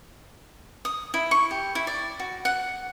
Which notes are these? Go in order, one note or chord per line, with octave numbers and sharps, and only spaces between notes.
D#6
E4
C#6
G4
E4
D5
F#4
F#5